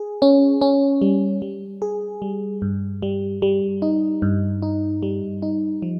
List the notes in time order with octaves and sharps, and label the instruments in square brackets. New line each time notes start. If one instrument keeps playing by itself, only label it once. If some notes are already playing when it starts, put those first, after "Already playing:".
Already playing: [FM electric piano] G#4
C#4
C#4
G3
G3
G#4
G3
G2
G3
G3
D#4
G2
D#4
G3
D#4
F3